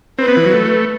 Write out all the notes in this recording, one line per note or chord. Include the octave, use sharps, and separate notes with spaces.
C4 B4
B3
E3
F#3
A3